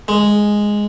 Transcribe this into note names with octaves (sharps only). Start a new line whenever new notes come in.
G#3